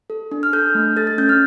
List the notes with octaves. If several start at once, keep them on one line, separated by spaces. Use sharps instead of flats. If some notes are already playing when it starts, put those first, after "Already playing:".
A4
D4
F6
A4 G6
A3
A4 A6
A6
C#4 G6
F6